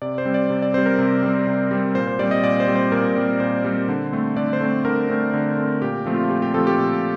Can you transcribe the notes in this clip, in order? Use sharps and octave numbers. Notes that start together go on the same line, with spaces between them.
C3 D5
C5
G3 C4
D5
C3
D5
G3 C4 C5
A#4
C3
G3 C4
C3
G3 C4
A#2 C5
C5
G3 C4 D5
D#5
A#2 D5
C5
G3 C4
C5
A#2 A#4
G3 C4
A#2 C5
G3 C4
D3
A3 C4
D3 D5
C5
A3 C4
D3 A#4
A3 C4
D3
A3 C4
A#2 G4
F3 A3 C4
F4
A#2 G4
G4
F3 A3 C4 A4
G4
A#2